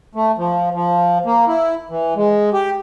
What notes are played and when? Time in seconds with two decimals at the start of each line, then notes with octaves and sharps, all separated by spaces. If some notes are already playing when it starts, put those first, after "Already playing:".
0.15 A3
0.38 F3
0.74 F3
1.26 A#3
1.48 E4
1.90 E3
2.16 G#3
2.53 G4